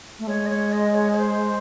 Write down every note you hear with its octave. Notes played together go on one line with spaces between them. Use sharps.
A3
G#3 C#5
D#5
C#5
D#5
C#5
C#5
C5